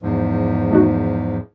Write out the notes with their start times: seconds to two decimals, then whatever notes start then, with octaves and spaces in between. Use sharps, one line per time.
0.02 E2 G#2 F3
0.71 A3 D#4 F#4